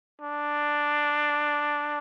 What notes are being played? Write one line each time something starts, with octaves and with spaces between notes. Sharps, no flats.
D4